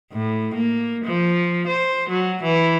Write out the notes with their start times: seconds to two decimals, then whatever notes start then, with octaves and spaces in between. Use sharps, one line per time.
0.13 A2
0.55 A#3
1.05 F3
1.68 C5
2.09 F#3
2.43 E3